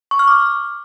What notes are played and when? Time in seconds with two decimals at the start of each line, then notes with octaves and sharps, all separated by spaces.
0.11 C#6
0.19 F6
0.28 D6